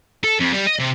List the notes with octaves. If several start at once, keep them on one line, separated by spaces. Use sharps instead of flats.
A4
F2
G3
D#5
C3